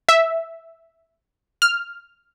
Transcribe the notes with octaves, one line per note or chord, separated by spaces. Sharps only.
E5
F6